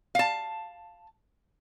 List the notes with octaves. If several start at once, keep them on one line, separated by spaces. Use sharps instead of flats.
F5 A5